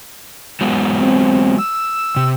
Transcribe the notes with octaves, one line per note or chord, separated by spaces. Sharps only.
F#3 G#3 B3
C4
E6
C3